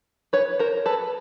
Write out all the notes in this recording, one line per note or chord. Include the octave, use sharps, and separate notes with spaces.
B4 C#5
A#4 C5
A4 B4